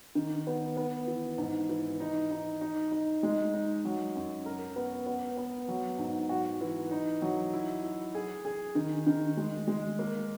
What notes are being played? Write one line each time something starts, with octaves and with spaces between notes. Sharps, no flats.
D#3
B3
B3
E3
G#2
E3
D#4
D#4
D#4
D#4
G#3
D#4
F#3
F#2
A#4
B3
B3
B3
F#3
G#2
F#4
E3
D#4
F#3
E4
E4
G#4
G#4
D#3
D#3
G#3
G#3
A#3